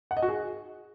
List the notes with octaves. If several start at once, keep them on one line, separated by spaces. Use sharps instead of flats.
F#5
D#5
F#4
G#4